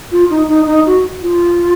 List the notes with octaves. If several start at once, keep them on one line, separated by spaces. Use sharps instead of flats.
F4
D#4
D#4
D#4
F#4
F4